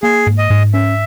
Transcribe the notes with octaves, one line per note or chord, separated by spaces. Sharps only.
A#3 G#4
G#2
D#5
G#2
C#4 E5